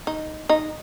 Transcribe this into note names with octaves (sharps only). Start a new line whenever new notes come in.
D#4
D#4